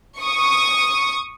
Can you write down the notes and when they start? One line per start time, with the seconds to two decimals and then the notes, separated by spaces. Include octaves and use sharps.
0.21 C#6 D#6